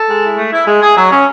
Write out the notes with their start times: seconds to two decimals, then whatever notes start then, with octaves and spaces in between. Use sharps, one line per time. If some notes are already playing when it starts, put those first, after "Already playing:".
Already playing: A4
0.08 G#3
0.22 E4
0.38 A3
0.52 E4
0.67 G#3
0.82 G#4
0.96 F#3
1.11 C#4